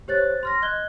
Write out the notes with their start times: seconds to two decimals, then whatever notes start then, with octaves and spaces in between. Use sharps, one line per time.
0.08 G4 C5 C#5 F#6 A6
0.43 C6 F6 A#6
0.62 D#5 F#6 G#6 G7